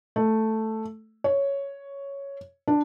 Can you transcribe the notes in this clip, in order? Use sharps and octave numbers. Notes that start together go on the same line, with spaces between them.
A3
C#5
D4